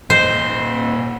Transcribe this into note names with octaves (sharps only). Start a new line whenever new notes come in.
A#2 C5 D#5